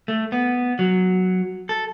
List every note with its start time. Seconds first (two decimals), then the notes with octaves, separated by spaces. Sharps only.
0.08 A3
0.32 B3
0.79 F#3
1.69 A4